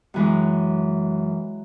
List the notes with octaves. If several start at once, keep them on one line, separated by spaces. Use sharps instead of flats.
F#2 E3 G#3